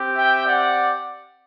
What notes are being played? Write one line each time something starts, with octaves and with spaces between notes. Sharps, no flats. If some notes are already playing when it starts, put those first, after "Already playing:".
Already playing: C4 G4
E5 G5
D5 F#5